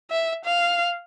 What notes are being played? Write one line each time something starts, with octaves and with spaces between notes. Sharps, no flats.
E5
F5